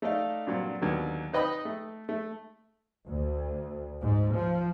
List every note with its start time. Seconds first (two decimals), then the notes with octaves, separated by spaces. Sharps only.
0.02 A3 D#4 A4 D5 D#5 F5
0.47 G2 A#2 F#3 C4
0.81 D#2 D3 F#3 B3
1.33 D#4 B4 D#5 G5 B5 D#6
1.65 A3
2.09 A3
3.07 D2
4.00 G#2
4.34 F3